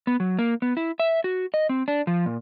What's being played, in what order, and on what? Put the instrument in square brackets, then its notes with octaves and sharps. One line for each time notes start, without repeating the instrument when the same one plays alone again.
[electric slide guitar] B3
F#3
A#3
B3
E4
E5
F#4
D#5
C4
D4
F3
A#2